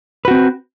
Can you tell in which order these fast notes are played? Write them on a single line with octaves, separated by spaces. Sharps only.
B4 F#4 C4